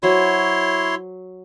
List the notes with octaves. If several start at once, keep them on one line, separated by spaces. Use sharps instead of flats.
F#3 E4 C5 C#5 C6